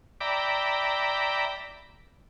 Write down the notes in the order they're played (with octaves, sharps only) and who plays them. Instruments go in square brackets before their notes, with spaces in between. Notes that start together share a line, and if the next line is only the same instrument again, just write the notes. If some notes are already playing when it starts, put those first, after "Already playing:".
[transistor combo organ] D5 E5 G5 A#5 B5 D6